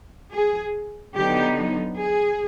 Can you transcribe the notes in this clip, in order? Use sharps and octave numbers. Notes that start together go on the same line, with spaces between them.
G#4
D3 F#3 B3 D#4 G4
G#4